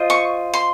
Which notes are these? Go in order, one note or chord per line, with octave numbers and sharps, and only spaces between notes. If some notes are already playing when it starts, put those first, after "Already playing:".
Already playing: F4 C5 D#5
C#6
C6